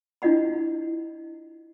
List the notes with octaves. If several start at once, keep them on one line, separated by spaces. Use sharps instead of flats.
D4 E4 F4 D#5 F#5 B5